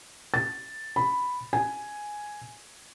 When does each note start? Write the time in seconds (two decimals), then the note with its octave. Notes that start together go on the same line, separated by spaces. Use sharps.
0.34 A6
0.96 B5
1.53 G#5